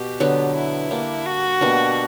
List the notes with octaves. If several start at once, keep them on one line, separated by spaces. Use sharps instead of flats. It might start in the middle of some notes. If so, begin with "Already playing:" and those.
Already playing: B2 F#4 G4
D3 F#3 B3
E4
G3 A#3 D4
F#4
B2 G3 A#3 D4